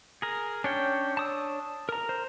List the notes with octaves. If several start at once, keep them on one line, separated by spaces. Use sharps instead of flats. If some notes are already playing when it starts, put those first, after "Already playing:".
G#4 A#4
C#4 D4 C#5 G5
A5 D#6 E6
A#4 A#5
C5